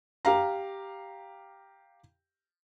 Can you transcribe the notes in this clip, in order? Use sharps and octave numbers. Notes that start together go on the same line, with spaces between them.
G4 F5 A#5